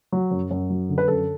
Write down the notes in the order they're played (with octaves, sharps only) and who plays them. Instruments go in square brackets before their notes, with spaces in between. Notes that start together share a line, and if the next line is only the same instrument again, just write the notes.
[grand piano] F#3
F#2
F#2
F#3
D3
B4
F#2 A4